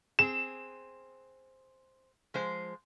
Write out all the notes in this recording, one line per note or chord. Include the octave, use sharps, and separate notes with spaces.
C4 G#4 E7
F3 G#3 C5